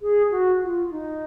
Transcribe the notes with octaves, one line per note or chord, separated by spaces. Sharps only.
G#4
F#4
F4
D#4